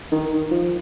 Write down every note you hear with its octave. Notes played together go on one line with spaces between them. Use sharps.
D#3
F3